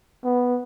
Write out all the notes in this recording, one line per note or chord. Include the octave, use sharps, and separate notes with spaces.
B3